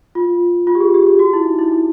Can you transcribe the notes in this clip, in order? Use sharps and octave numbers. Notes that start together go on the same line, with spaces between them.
F4
F4
G4
G#4
G4
G4
F#4
E4
D#4
E4
E4